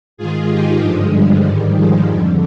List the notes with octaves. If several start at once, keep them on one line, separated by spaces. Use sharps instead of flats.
G#2 D#3 F4 G#4
D#4 G4
G2 D3 F3 G#3
G3
G#2 D#3 G3
F3 G#3
F2 D3